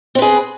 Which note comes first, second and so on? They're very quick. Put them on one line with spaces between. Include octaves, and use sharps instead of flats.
C4 B4 G#4